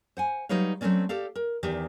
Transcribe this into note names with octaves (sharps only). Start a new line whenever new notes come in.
C5 F#5 G#5
F#3 G3 D#4 B4 C#5 F5
F#3 A3 A#3 C4 C#4 D5
G4 A4 D5 F5
A#4
E2 D#3 G4 D5 E5